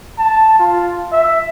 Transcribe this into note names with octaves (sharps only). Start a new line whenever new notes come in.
A5
F4
E5